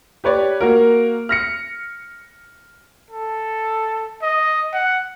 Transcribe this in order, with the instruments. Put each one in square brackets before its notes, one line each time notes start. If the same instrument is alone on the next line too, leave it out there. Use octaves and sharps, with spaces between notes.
[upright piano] G4 B4 C#5 D5
A#3 F#4 A#4
F6 A#6 C#7
[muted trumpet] A4
D#5
F#5